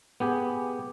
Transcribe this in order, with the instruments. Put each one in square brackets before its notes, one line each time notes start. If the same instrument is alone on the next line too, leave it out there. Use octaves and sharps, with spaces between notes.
[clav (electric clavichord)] B3 G4 G#4